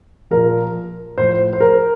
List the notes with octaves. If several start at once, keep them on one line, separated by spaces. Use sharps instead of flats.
A#2 F3 A#4
A2 F3 C5
C5
A#4